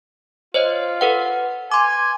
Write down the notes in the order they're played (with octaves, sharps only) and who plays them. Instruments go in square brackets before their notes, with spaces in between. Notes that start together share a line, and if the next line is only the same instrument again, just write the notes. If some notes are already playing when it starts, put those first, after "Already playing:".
[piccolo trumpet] F4 [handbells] C5 C#5 D#5
[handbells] A4 B4 F#5
[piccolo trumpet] G#5 [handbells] C6 D6